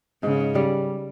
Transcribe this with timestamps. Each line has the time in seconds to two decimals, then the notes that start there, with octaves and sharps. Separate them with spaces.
0.23 G#2 C#3
0.55 G3